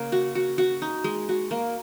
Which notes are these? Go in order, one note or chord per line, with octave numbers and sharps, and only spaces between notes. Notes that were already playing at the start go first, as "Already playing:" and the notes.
Already playing: C#3 A#3 C#5
F#4
F#4
F#4
D#4
G#3
F#4
A#3